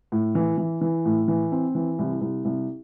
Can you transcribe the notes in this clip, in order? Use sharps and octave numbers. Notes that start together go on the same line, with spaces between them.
A2
E3
E3
E3
A2
E3
C4
E3
C2
C2
C2